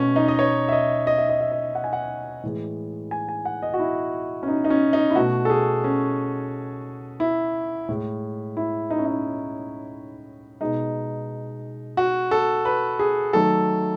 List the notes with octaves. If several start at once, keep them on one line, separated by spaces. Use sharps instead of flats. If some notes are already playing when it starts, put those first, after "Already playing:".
Already playing: B2 A3 C#4
D#4
D#5
C#5
E5
D#5
D#5
E5
D#5
E5
D#5
F#5
G#5
F#5
A2 E3 G#3
G#5
G#5
F#5
D#5
F#4
E4
C#4
D#4
D#4
C#4
D#4
E4
B2 A3 F#4
A4
G#4
C#4
E4
A2 G#3
E4
D#4
C#4
D#4
B2 G#3 D#4
F#4
A4
B4
G#4
D#3 F#3 A3 A4